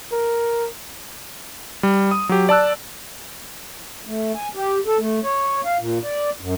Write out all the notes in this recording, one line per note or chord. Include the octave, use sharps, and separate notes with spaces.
A#4
G3
D#6
F#3 G4
D5 A5 E6 F#6
A3
G#5
G4
A4
A3
C#5
F5
A#2
D5
F#2